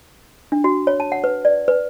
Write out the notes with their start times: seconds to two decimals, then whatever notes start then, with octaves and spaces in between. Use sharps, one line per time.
0.52 D4
0.64 F#4
0.87 C#5
1.00 A5
1.12 F#5
1.24 B4
1.45 D5
1.68 B4